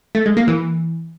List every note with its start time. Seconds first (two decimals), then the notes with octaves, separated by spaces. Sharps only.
0.15 A3
0.26 G#3
0.37 A#3
0.48 E3